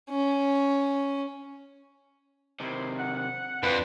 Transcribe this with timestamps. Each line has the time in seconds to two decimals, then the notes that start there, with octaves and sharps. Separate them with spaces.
0.11 C#4
2.60 C3 D#3 E4 C5
2.97 F#5
3.63 F2 D4 B4